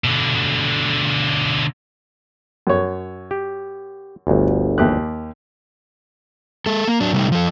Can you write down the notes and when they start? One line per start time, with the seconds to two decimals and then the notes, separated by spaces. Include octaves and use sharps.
0.04 B2 D3
2.67 F#2 C#5
3.31 G4
4.27 G1 D2
4.78 D#2 G4 F#6
6.66 G#3 A4
6.88 A#3
7.00 F#3 D4
7.13 C3 G3 A3 D#4
7.32 F3 A4